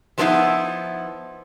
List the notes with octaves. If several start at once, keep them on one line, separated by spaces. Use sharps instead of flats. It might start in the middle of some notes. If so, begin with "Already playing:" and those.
F3 G#3 B3 C4 D#4 E4